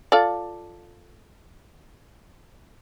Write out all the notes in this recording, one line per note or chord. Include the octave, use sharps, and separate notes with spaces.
F4 A4 D5